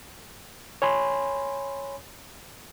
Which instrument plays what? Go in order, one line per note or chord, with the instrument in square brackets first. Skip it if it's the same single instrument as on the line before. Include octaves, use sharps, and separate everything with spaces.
[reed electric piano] C#5 G#5 B5 C6